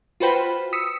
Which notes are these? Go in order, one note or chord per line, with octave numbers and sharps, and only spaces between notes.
F4 F#4 B4 C5 G5 B5
D#6 E6 B6 C#7